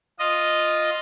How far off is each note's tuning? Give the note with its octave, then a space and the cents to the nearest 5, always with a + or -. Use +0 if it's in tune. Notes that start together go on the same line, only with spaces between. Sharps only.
F4 +0 D#5 -5